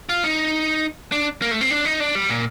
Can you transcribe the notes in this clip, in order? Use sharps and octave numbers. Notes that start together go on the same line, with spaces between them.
F4
D#4
D4
A#3
A3
C4
D4
D#4
D4
G3
A#2